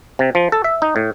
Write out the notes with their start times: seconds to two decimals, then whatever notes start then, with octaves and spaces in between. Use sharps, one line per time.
0.19 C3
0.35 F3
0.52 A4
0.64 E5
0.82 D#4
0.96 A2